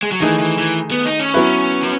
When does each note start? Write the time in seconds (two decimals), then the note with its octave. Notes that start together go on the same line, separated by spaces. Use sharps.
0.03 G#3
0.12 F#3
0.20 D#3 E3 A3 D#4 G#4
0.39 E3
0.58 E3
0.91 B3
1.06 D#4
1.20 C#4
1.34 F#3 B3 E4 B4
1.83 F#3